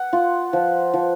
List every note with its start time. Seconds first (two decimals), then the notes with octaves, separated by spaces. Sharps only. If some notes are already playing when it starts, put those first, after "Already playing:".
Already playing: F#5
0.13 F4
0.53 F3
0.94 F3